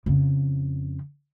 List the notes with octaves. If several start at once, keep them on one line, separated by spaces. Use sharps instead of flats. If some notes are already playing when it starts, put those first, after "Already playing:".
F2 C#3